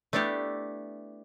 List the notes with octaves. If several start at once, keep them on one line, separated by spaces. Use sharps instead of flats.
A3 B3 D4 E4 G4